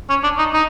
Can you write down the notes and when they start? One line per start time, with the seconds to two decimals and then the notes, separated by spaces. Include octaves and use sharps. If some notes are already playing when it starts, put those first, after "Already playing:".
0.10 C#4
0.23 D4
0.38 D#4
0.54 D#4